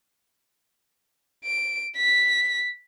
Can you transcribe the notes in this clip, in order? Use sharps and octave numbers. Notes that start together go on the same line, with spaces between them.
D7
B6